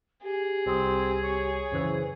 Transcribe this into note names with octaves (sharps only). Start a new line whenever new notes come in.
G4 G#4
C2 C4 D#6
C#5
F#2 C#3 E3 C5